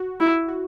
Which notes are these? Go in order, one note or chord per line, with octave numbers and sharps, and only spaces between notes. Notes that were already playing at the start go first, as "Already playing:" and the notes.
Already playing: F#4
E4
F#4